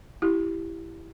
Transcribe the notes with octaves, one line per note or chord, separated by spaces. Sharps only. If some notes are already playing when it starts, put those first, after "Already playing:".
E4 G4